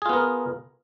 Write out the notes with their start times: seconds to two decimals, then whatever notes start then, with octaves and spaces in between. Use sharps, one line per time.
0.02 G#4
0.06 F4
0.09 B3
0.13 A#4